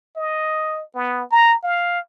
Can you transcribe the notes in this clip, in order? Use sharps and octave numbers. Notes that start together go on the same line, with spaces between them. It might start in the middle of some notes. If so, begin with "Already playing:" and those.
D#5
B3
A#5
F5